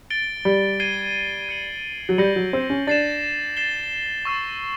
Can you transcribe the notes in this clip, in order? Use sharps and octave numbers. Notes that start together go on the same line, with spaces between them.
A6 D7 G7
G3
G#6 C7 D#7 G7
G#6 C#7 F#7
F#3
G3 G6 A#6 C#7 F#7
F#3
C4
C#4
D4 A6 C7 E7
A6 C7 E7 G7
C#6 E6 A6 C7